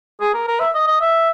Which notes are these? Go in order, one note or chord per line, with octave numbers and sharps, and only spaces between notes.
G#4
A#4
A#4
E5
D#5
D#5
E5